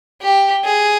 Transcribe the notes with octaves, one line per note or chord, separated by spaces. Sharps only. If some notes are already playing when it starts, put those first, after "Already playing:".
G4
G#4